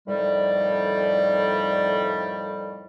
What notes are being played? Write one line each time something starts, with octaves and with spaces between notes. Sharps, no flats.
F2 A2 D#3 G3